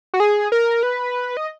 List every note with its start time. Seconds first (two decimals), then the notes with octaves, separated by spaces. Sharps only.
0.14 F#4
0.20 G#4
0.52 A#4
0.83 B4
1.37 D#5